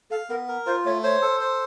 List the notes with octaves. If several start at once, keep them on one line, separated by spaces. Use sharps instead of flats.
A4 F5
B3 A#4
A#4
F4 C5
A3 C#5
C5 C#5
A4
C5